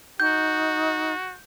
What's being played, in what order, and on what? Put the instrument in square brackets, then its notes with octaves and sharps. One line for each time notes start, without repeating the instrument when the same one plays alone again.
[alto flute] D#4 [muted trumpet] F#4 [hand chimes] G6